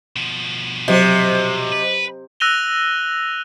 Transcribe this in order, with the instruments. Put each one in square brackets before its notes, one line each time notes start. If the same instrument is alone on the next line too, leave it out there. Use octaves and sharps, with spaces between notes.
[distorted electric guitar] B2 F3
[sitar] C3 [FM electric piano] F#3 C5 D#5
[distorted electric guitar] B4
[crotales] E6 F#6 A#6 D#7 F7 G7